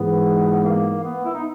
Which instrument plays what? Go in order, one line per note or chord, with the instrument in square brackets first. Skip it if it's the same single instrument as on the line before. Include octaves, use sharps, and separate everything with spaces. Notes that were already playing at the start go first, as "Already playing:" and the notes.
Already playing: [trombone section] G#2 E3 G#3 [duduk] B3
[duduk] A#3
B3
E4
D#4